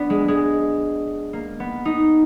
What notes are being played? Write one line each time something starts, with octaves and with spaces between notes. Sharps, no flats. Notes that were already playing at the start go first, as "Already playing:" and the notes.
Already playing: B3 D4
G#3
G#3
A#3
B3
D#4